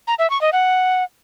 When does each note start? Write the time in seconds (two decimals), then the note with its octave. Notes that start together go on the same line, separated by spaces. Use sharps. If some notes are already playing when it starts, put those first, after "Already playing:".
0.08 A#5
0.19 E5
0.30 C#6
0.41 D#5
0.53 F#5